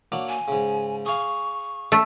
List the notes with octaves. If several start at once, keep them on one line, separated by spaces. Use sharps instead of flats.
F#3 A#3 D4
G#5
G#2 C#3
G#4 F5 C#6
A3